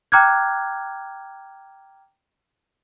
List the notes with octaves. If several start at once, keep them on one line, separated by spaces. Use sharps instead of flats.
G5 A#5 D6 F6 F#6 G#6